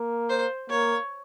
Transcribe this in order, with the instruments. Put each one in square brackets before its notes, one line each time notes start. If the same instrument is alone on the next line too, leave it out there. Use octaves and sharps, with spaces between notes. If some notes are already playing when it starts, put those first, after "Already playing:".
Already playing: [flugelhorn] A#3
[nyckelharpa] C5
[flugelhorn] A#3 [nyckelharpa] C#5